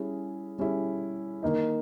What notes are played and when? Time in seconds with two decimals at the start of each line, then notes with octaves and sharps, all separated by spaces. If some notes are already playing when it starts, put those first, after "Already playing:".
Already playing: G3 C#4 E4 G#4
0.59 G3 C#4 E4 G#4
1.43 D#3 A#3 D#4